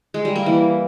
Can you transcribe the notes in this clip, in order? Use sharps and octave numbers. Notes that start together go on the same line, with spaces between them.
G#3
G3
A#3
E3